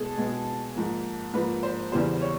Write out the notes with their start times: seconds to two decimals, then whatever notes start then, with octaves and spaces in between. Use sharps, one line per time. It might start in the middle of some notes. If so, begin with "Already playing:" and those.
Already playing: B2 G#3 B3 G#4 A4
0.17 B2 G#3 B3
0.75 G#2 F3 A#3
1.33 G#2 F3 A#3 B4
1.63 C5
1.92 E2 C#3 E3 G3 B3 C5
2.21 C#5